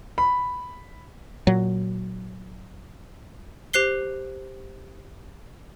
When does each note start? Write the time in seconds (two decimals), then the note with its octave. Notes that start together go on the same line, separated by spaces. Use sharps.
0.18 B5
1.47 A#2 F#3
3.73 G4 C5 F#6 C7 G7